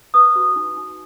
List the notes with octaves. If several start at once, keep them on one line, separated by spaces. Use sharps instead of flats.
B4 D#6
F#4
D#4
D#4